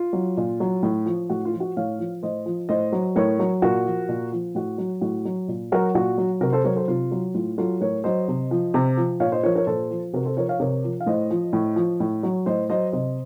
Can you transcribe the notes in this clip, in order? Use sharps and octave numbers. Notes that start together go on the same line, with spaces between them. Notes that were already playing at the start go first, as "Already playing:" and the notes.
Already playing: F4
F#3
A#2
F#3
A2
F3
A2 F#4
F4
F3
F#4
A2 C#5 F5
F3
A2 C5 D#5
F3
A2 C5 D#5
F#3
A2 A#4 C#5
F#3
A#2 F#4 A#4
F3
A#2
F3
A2 F#4
F#3
A2 F#4
F#3
A#2
F#3 F#4 A#4
A#2 F#4
F#3
C3 F#4 A#4
A4 C5
F#3 A#4 C#5
A4 C5
C3 F4
F#3
A2 F4
F#3 F4 A4
A2 A#4 C#5
F#3 C5 D#5
C3
F3
C3
F3
A#2 C#5 F5
C5 D#5
F3 A#4 C#5
A#4 C#5
A#2 A4 C5
F3
C3 F#4 A#4
A4 C5
F3 A#4 C#5
C#5 F5
C3 A#4 C#5
F3
F5
A2 C5 D#5
F3
A2
F3
A2
F#3
A2 C5 D#5
F#3 C5 D#5
C3 C5 D#5